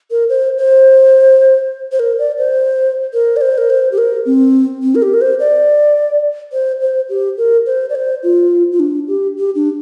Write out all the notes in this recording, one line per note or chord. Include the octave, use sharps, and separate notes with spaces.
A#4
C5
C5
C5
A#4
D5
C5
A#4
D5
C5
A#4
C5
G4
A#4
C4
C4
A#4
G4
A#4
C5
D5
C5
C5
G4
A#4
C5
D5
C5
F4
F4
D4
G4
G4
D4